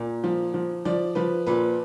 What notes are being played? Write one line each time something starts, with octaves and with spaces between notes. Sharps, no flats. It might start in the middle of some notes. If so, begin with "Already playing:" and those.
Already playing: A#2
F3
F3
F3 D5
F3 B4
A#2 B4